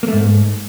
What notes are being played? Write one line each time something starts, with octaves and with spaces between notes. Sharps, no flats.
A#3
A3
G#2